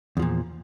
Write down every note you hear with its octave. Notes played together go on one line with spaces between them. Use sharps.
E2 A#2 F3